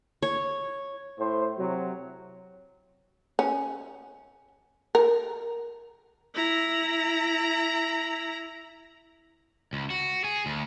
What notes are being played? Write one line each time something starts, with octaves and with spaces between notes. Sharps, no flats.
C#5
A2 C5
C3 F#3
C#4
A#4
E4 A#5
C#2
F#4
G#4
D2